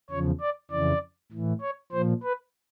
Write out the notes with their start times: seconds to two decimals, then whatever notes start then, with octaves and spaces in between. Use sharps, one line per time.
0.10 E2 C#3 F3 C#5
0.40 D5
0.71 F2 C#3 E3 D5
1.32 A2 E3
1.62 C#5
1.92 A#2 F3 C5
2.23 B4